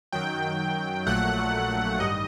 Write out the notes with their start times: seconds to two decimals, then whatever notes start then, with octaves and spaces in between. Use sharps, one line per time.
0.13 F#2 D#3 F#3 G5
1.07 A#1 A#2 F#3 A3 F#5
1.99 A1 G2 D#3 G3 D#5